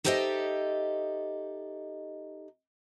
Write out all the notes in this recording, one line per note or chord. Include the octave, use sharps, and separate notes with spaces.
D#4 G4 A4 C5 D#5 E5